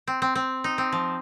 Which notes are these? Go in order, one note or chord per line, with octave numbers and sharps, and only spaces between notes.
C4
C4
C4
D#4
C4
F3